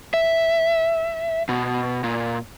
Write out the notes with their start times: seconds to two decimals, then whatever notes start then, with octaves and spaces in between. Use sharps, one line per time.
0.14 E5
1.49 B2
2.04 A#2